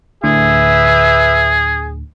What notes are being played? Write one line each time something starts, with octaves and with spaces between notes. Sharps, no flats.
D2 A2 D3 G#4 B4 E5